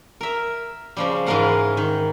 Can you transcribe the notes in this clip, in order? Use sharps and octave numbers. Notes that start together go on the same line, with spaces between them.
A#4 E5
C#3 F3 G3
G#2 E3 G#3 A#4 F5 F#5
D#3